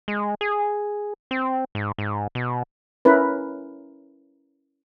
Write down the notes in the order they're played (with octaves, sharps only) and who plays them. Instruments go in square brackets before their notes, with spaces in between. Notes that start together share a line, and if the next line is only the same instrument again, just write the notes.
[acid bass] G#3
G#4
C4
G#2
G#2
B2
[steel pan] C#4 E4 A#4 B4